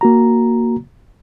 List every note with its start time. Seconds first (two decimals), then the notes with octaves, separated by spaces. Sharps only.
0.01 A#3 F#4 A#5